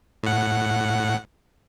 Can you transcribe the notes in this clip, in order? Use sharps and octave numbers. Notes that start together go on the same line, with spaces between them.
A2 F#5